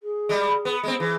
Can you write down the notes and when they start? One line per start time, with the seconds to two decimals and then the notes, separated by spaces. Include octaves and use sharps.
0.02 G#4
0.29 G3 G#3
0.65 B3
0.83 G#3 B3 C4
1.00 E3 G#4